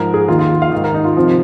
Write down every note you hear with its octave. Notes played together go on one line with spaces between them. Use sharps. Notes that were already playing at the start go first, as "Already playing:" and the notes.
Already playing: G#2 F3 A#4
G#4
D#2 D#3 F4
F4
F5
G#2 D#3
A#4
D#4
F4
C3 F3